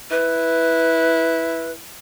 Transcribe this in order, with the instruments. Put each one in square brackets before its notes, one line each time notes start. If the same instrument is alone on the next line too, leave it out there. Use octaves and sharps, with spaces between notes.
[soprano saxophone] E4 [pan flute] B4